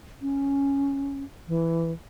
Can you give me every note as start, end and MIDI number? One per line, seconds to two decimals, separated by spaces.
0.22 1.24 61
1.48 1.91 52